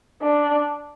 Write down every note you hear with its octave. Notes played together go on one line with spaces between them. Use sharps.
D4